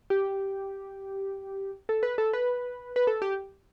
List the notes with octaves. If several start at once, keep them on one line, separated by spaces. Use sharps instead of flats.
G4
A4
B4
A4
B4
B4
A4
G4